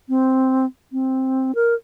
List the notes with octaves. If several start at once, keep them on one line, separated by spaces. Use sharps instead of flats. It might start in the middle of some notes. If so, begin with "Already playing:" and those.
C4
C4
A#4